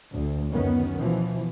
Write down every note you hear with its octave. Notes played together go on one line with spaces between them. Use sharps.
D2
F#2 D#3 B3 C#4
B2 E3 F3